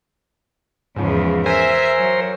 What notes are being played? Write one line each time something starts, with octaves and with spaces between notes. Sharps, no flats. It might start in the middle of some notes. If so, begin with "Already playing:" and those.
E2 G#2 C#3 F3
A#4 C5 E5 G#5
F#3